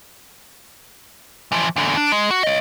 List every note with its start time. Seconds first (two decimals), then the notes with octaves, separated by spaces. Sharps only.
1.52 E3 F3
1.76 E2 D3
1.97 D4
2.12 G#3
2.30 F#4
2.43 C#5 D#5